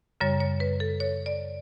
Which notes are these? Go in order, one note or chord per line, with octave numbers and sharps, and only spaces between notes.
F#2 C#3 G3 C#5
C#5
B4
A4
C#5
D5